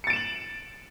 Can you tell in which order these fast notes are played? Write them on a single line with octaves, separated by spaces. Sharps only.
C#7 A6 D7 E7 F#7